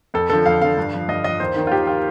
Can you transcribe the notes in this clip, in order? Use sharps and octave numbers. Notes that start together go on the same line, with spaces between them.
F2 A4
D3 F3 A4
F2 F5
D3 F3 F5
G2
F3
G2 D#5
F3 D#5
D#2 C5
D#3
F4
D#2 G4
D#3 F4